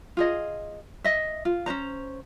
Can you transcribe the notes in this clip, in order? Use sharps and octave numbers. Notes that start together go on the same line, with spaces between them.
F4 G#4 D#5
D#5 E5
F4
C#4 D4 C5 A#5